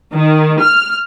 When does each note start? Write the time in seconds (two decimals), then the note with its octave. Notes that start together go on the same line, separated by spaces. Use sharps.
0.14 D#3
0.61 F6